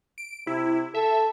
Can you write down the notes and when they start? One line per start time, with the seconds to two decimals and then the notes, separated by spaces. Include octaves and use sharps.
0.18 D7
0.47 C3 E4
0.95 A4 E5